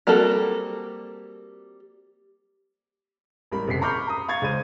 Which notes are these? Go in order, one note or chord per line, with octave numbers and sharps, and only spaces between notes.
G3 A#3 C4 F#4 A4
A1 G3 A#4 B5
F#1 F#2 C3 B6 C7
A#5 B5 C#6 D6 F6 G6
A#5 D#6
F5 C#6 G#6 A6
C#2 G#3 C5 D#7